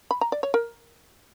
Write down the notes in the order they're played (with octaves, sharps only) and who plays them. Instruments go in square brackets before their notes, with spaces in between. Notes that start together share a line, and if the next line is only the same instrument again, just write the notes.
[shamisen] B5
A#5
D5
C#5
A#4